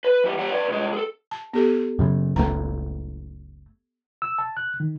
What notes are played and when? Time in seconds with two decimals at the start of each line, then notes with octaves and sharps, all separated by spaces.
0.04 B4
0.24 E3 G3
0.39 G3 F#5
0.52 B4 D5
0.68 C2 G#3
0.93 G#4 A4
1.31 A5
1.53 B3 G4 A4
1.99 F#2 C#3
2.36 F#1 C#2 A3 A#5
4.22 E6
4.38 A5
4.57 F#6
4.80 D#3